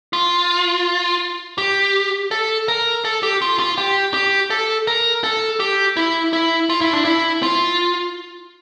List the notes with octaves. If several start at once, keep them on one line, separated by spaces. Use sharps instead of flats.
F4
G4
A4
A#4
A4
G4
F4
F4
G4
G4
A4
A#4
A4
G4
E4
E4
F4
E4
D4
E4
F4